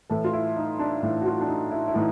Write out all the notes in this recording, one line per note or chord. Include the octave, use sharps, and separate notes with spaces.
A2 E3 A4
F4
E4
D#4
D4
A2 E3 E4
F#4
F4
D4
D#4
E4
E4
A2 E3 D#4